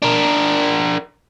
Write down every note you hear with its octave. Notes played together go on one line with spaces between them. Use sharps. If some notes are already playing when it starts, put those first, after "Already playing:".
D4 A#4